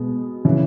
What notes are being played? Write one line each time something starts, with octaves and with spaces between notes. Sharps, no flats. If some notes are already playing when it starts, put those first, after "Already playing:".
Already playing: B2 G#3 B3
C#3 E3